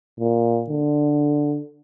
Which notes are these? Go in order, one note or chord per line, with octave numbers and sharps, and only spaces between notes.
A#2
D3